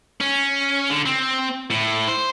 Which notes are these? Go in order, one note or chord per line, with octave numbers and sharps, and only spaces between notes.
C#4
D3
C4
A2
C5